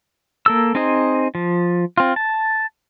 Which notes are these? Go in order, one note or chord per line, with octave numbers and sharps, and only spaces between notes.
A#3 A4 E6
C4 D#4 G#4 C5 D#5
F3
C4 F4
A5